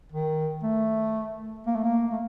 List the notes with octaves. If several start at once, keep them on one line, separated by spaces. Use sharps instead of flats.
D#3
A3
A#3
A3
A#3
A3